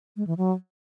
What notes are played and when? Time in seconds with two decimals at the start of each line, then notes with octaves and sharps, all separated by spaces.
0.17 G#3
0.27 E3
0.38 F#3